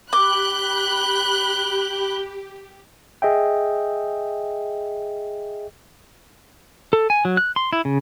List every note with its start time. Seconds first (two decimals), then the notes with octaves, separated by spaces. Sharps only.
0.13 G4 B5 D6 F#6 G7
3.22 G#4 D#5 E5 G5
6.93 A4
7.10 G#5
7.25 F#3
7.37 F#6
7.56 C6
7.73 E4
7.85 C#3